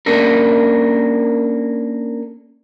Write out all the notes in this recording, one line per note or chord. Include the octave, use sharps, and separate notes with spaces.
A#3 C#4 D4 A4 A#4